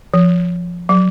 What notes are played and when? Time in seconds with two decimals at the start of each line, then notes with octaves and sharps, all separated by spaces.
0.14 F3
0.89 F#3